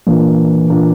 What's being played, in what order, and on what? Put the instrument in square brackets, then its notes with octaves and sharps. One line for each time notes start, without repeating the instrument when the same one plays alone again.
[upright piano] A#2 A#3 D4 [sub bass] E3
[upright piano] A#2 A#3 D4